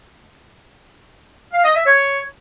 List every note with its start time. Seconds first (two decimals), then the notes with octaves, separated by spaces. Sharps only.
1.53 F5
1.64 D#5
1.75 E5
1.86 C#5